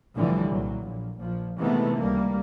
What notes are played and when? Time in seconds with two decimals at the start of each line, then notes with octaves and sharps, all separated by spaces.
0.15 C2 A2 D3 E3 F3 G3
0.49 C2 A#2 F#3
0.81 A#1
1.20 A#1 F3
1.58 C3 D#3 E3 G#3 A3 B3
1.96 C#2 G3 A#3